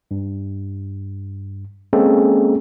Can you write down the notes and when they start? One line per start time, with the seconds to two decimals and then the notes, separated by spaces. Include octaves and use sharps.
0.11 G2
1.93 G#3 A#3 C4 C#4 G#4 A4